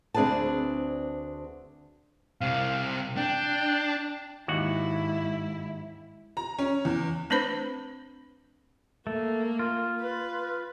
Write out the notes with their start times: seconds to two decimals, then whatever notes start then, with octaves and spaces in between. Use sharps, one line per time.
0.14 D2 C4 D4 G#4 B4 A5
2.41 C2 C3 F5
3.17 D4 G5
4.48 D#2 G#2 E4 F#4 F#5
6.37 A#5
6.59 C#4
6.85 E2
7.30 A3 C4 D4 B4 C5 B5
9.07 A3 A#3
9.59 F4
10.00 B4